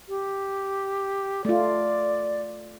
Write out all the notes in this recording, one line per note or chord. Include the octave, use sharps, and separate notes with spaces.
G4
A3 F4 D5